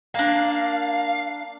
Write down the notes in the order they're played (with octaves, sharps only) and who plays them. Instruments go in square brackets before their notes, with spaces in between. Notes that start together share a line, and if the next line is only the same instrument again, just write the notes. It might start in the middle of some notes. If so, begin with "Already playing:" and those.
[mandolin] A#3 D4 [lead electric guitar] F5